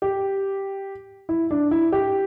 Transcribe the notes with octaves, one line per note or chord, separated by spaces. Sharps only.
G4
E4
D4
E4
G4